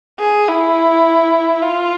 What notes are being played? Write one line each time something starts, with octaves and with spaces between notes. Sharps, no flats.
G#4
E4
F4